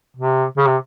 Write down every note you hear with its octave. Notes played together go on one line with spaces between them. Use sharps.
C3
C#3
C3